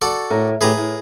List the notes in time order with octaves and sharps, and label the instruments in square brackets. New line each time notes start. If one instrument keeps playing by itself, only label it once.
[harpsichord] F#4 A4 D5
[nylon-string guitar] A2 A#4
[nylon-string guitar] A2 G4 [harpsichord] G#4 B4 A#5
[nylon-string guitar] A2